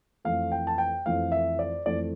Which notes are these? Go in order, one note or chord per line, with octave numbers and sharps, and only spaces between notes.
F2 E3 A3 F5
G5
A5
G5
F2 E3 A3 F5
E5
D5
F2 E3 A3 D5